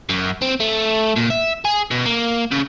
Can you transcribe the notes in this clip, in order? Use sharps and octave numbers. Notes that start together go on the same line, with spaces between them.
F#2
C4
A3
A#2
E5
G#4
B2
A#3
C#3